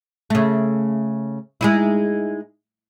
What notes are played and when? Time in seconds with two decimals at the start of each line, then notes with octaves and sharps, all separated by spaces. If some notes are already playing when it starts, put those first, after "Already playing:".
0.30 C#3 A3
1.61 G#3 D#4 E4